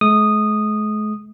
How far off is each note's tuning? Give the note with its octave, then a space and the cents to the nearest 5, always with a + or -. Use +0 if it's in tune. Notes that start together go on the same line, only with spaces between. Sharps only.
G#3 +45 D#6 -10